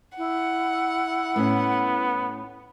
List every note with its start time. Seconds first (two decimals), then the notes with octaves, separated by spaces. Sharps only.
0.17 E4 F#5
1.36 A2 B3 C#4